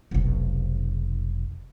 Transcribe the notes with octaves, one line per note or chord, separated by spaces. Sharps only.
F1 B1